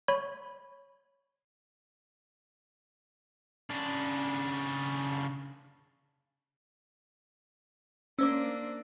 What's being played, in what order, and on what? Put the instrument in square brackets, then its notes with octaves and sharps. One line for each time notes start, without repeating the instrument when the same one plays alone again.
[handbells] C#5 B5
[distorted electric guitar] C#3 D4
[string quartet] A#3 D4 [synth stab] C#4 C5 D6 [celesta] E6